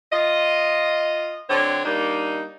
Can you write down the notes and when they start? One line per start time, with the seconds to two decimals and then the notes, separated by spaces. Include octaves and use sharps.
0.12 F4 D#5
1.50 D3 F#3 C4 C#5
1.85 G3 A#3 D4 D#4